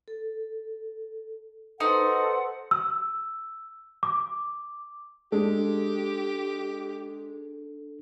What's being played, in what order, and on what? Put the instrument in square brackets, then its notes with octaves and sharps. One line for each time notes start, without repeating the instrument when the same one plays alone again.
[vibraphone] A4
[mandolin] D#4 F#4 [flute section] A4 F#5 [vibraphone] B4 C5 C6
[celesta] E6
D6
[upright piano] G#3 [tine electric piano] D4 A4 [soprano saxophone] G4